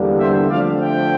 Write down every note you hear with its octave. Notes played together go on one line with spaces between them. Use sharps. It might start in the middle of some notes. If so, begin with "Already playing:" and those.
Already playing: E2 D3 G3 A#3 D4
C5 E5
D3 F3 A3 C4 D5 F5
E5 G5